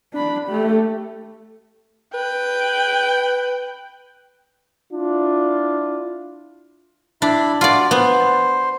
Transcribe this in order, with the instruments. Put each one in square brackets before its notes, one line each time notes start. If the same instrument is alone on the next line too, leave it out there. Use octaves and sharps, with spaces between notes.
[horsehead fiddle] D4 B5
A3 G4
[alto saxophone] B4 [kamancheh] G5
[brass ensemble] D4 E4 F4
[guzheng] D4 [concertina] E4 B5
[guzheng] F4 D5 [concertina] F#4
[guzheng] B3 [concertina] C5